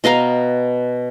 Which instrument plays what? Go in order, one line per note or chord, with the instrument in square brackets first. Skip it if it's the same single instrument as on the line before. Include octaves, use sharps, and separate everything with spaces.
[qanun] B2 D#5 F5 A#5